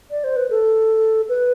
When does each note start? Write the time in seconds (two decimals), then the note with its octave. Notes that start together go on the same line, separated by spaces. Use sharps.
0.11 D5
0.24 C5
0.36 B4
0.50 A4
1.29 B4